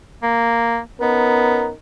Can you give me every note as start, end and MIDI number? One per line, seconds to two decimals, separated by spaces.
0.23 0.79 58
1.00 1.69 59
1.00 1.72 61
1.00 1.72 63
1.00 1.72 70